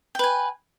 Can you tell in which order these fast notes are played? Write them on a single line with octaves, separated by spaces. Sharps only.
G5 B4 G#5